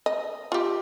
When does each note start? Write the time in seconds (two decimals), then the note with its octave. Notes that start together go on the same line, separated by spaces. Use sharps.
0.06 D#5
0.52 F4 G4